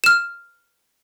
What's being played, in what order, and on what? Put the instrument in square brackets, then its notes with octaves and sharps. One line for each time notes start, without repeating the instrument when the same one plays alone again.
[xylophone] F6 E7